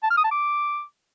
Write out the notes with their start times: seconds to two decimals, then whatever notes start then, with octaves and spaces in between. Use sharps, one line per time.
0.03 A5
0.10 F6
0.17 D#6
0.24 A5
0.31 D6